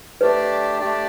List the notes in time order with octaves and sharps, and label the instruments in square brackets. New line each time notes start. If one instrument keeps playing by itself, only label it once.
[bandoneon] A3 D4 G4 D5 [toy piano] B4
[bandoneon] A3 D4 G4 D5